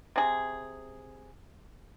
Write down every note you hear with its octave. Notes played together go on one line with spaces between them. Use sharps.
C3 G#4